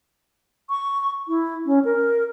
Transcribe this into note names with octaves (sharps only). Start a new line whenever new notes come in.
C#6
E4
C#4
A#4